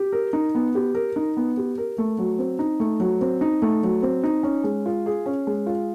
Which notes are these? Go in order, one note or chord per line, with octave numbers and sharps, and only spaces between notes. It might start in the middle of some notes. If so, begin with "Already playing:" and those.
Already playing: G4
A#4
D#4
B3
G4
A#4
D#4
B3
G4
A#4
A3
F#3
C4
D#4
A3
F#3
C4
D#4
A3
F#3
C4
D#4
C#4
G#3
F4
G#4
C#4
G#3
F4